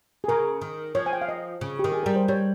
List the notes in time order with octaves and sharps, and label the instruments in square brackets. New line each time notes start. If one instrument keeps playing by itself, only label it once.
[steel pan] G#4
[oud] C#3 [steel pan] A#4
[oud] D#3
[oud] F3 [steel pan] C#5
[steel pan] G#5
G5
F5
D#5
[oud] C#3
[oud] D#3 [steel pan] G4
[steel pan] G#4
[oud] G3 [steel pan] A#4
[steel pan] C5
[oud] G3 [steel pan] C#5